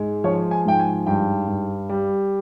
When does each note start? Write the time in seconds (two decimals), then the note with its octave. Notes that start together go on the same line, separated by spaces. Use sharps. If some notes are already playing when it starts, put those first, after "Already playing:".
Already playing: G#2 G#3
0.24 F3 C#5
0.51 G#5
0.65 G#2 G5
0.80 G#5
1.06 G2 G5
1.48 G2
1.89 G3